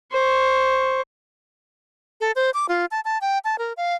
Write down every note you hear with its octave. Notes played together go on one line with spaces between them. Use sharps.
C5 C#6
A4
C5
D6
F4
A5
A5
G5
A5
A#4
F5